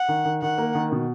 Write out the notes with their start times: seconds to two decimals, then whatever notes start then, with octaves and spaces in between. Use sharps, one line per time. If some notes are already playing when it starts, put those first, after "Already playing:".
Already playing: F#5
0.08 D#3
0.25 D#3
0.42 D#3 F#5
0.58 A#3
0.75 D#3
0.92 B2